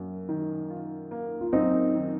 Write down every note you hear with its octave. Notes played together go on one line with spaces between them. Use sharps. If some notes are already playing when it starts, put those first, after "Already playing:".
Already playing: F#2 A#3
D#3
F4
A#3
F4
F#2 C4 D#4
D#3